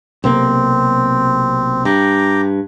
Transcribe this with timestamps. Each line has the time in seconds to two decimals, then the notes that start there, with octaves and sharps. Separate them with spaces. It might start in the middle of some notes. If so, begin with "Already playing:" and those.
0.24 B1 C3 A#3 C4
1.85 G2 G5 A#5 D6